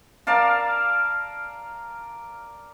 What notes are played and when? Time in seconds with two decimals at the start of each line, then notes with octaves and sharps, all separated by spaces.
0.27 A#4 D5 F5 A5